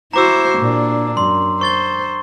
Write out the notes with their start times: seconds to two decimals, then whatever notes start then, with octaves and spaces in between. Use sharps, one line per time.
0.13 E4 F#4 C5 A#5 D6 E6
0.58 A#2 D4
1.17 F#2 C6
1.61 C5 C#6 A6 G7